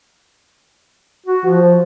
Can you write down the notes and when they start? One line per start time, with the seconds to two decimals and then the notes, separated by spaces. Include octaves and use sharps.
1.27 F#4
1.45 F3